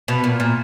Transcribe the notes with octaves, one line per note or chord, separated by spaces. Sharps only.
B2 B3
A#2
A#2